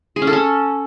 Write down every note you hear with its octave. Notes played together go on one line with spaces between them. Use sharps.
G#4
C#4
A4
C#4